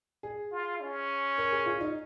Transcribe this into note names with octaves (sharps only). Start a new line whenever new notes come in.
G#4
F4
C#4
A#4
G#4
F4
D#4